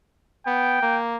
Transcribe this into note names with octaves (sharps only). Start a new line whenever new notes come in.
B3 G5
A#3